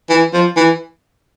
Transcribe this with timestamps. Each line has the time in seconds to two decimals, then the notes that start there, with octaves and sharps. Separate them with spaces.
0.10 E3
0.33 F3
0.57 E3